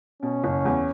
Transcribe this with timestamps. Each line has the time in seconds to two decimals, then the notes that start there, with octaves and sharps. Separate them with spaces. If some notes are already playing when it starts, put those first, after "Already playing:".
0.22 B2 C#4
0.44 F#1
0.65 E2